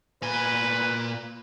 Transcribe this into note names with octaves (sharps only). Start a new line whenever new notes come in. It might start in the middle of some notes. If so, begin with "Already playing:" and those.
A#2 B4 G#5